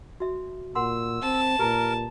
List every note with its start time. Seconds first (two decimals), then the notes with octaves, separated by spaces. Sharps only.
0.20 F#4 E5
0.75 A#2 A#4 F#5 C6 E6
1.22 C4 A5
1.59 A#2 G4 A#4 B4 A#5